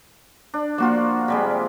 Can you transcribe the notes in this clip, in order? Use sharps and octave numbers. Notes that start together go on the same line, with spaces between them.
D4
F3 A#3 F4 F#4 D5
C3 G3 G#3 B5